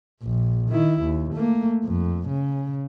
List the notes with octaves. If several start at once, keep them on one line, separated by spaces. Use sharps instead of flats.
A#1
D#3 E4
D#2
A3 A#3
F2
C#3